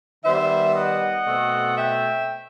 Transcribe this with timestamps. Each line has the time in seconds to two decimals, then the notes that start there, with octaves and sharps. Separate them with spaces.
0.24 D#3 G3 B3 C5 E5
0.75 D#5 F#5
1.27 B2 A3 C4
1.78 E5 G5